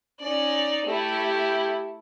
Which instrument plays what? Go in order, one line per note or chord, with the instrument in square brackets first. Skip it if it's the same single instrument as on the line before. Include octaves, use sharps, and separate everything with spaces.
[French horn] C#4 [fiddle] D#4 D5
[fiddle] A3 E4 [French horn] G4